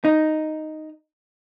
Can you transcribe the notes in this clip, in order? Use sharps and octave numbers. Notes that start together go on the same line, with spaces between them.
D#4